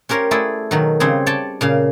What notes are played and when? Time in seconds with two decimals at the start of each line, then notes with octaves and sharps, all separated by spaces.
0.09 C#4 G4 A#4 C5 C#5
0.31 A3 E4 G#4 D5
0.71 B2 D#3 F#3
1.00 C#3 G3 C4 G#4
1.26 C#5 D5 G5 A5
1.61 A#2 C#3 F5